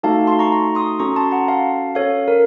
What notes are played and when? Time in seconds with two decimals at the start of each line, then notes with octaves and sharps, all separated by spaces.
0.03 A3 D#4 F#4 A4 F5 A5
0.27 A5 C6
0.39 A#5 C#6
0.52 A#5 C#6
0.75 C6 D#6
0.99 C#4 F#4 A4 A#5 C#6
1.16 A5 C6
1.31 F#5 A#5
1.48 F5 A5
1.95 C#4 A4 C#5 F5
2.28 A#4